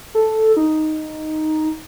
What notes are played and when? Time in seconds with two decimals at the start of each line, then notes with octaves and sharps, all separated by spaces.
0.15 A4
0.57 D#4